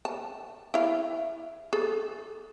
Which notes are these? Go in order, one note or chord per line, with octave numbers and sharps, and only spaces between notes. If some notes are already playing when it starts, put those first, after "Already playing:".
A5
E4 F5
G#4 A4